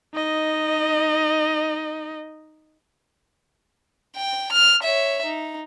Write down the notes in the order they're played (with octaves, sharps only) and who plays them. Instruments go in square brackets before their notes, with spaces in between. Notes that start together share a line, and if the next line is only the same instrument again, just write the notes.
[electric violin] D#4 D#5
[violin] G5
F6
C#5 E5
D#4